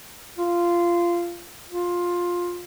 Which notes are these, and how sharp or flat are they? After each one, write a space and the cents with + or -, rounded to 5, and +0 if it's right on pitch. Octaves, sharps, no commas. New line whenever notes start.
F4 -15
F4 +10